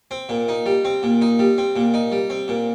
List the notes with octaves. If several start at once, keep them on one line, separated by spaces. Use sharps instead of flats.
C4
A#2
D#4
G3
C4
A#2
D#4
G3
C4
A#2
D#4
G3
C4
A#2